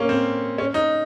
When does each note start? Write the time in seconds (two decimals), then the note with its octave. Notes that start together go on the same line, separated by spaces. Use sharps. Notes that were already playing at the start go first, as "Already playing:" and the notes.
Already playing: A#3 C#4
0.09 C4
0.58 C#4
0.74 D#4